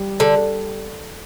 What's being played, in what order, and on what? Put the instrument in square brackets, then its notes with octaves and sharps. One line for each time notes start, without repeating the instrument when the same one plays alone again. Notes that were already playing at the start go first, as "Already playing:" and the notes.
Already playing: [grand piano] G3
[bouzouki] D3